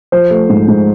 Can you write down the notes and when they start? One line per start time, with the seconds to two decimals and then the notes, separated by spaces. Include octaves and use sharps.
0.12 F3 C5
0.30 A3
0.49 G#2
0.68 G#2